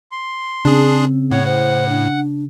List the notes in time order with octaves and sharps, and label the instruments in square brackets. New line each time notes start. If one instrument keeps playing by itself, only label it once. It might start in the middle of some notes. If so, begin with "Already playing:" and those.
[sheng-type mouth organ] C6
[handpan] C#3 [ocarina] C4 [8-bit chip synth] D4 G#4
[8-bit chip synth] A2 [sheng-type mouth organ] C#5 F#5
[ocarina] C5 [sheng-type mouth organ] F#5
[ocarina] D4